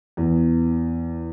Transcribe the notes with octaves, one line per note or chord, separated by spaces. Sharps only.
E2